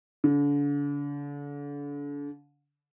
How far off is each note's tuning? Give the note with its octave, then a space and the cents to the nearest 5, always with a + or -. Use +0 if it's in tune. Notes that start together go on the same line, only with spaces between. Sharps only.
D3 -35